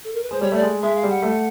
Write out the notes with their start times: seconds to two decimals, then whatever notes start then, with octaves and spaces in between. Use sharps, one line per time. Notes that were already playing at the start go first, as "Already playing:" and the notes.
0.04 A4
0.13 A#4
0.23 B4
0.31 G#3 C5
0.41 G3 C#5
0.52 A3 D5
0.62 G#3
0.82 G#3 E5
0.96 F5
1.03 G3
1.10 F#5
1.22 A3